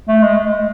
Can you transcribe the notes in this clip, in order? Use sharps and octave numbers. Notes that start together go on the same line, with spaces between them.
A3
G#3